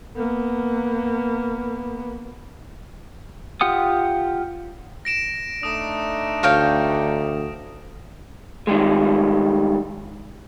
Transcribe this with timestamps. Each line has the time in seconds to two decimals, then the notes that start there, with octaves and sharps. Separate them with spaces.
0.16 A#3 B3
3.61 F4 G4 F#5 D#6
5.05 A#6 D7 E7
5.63 A3 D4 D#4 D#6 E7
6.43 D2 C#5 F5 G5
8.67 D#3 G3 G#3